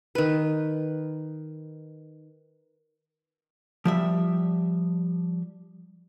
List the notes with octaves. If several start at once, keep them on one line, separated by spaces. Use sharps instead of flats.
D#3 B4
F3 G3 E5